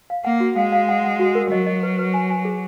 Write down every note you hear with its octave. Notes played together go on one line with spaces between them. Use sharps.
F5
A#3 F#5
F#4
G#3 F5
F5
F#5
F#5
F#4
A#4
F#3 D#5
D#5
B4
B4
G#5
G#5
G#4